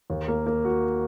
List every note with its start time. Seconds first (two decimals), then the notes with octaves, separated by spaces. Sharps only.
0.10 D#2
0.28 A#3
0.46 A#3
0.65 F#4